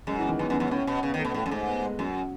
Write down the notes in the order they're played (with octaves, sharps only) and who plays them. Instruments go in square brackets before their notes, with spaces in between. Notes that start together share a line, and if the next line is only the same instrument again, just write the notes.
[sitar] F#2 [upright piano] G#3
[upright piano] E3
D#3
[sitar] F#2 [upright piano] B3
[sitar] F#2 [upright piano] B3
[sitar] F#2 [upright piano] C#4
[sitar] A2 [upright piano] C#4
[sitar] B2
[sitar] C#3 [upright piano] B3
[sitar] D#3
[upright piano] A3
[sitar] B2
[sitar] A2 [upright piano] A3
[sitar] F#2
[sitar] G#2 [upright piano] A3
[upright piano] B3
G#3
[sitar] F#2 [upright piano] F#3